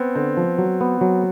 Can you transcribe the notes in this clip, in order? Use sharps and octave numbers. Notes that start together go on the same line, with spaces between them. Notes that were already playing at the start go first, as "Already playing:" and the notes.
Already playing: B3 C4
D3 C4
F3
F#3
B3
F#3